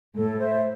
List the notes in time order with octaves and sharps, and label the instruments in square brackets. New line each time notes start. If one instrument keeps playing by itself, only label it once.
[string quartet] A2 [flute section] A4
[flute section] C5 E5